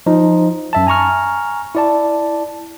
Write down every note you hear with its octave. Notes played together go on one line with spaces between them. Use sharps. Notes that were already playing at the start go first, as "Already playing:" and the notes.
F3 D#4
F#2 E5 A5
G#5 A#5 C#6 F6
E4 D5 A5